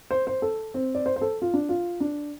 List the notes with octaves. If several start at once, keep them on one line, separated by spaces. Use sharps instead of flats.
C5
C5
A4
C4
D5
C5
C5
A4
F4
D4
F4
D4